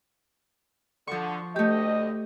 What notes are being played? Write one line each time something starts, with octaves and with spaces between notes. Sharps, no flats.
D3 F3 C#6
D2 A3 G4 D#5